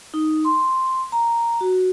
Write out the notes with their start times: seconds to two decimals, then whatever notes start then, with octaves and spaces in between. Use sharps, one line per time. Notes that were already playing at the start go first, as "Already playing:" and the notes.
0.14 D#4
0.45 C6
1.12 A#5
1.61 F#4